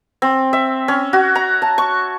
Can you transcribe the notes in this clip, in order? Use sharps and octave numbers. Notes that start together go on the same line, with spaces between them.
C4
E5
C#4
F#4
A#5
A5
C#6